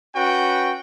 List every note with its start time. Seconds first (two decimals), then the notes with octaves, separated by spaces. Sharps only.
0.16 C#4 F#4 B4 G5